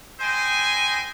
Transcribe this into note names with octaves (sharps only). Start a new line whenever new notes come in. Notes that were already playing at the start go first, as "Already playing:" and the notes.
E4 C5 D#5 G5 G#5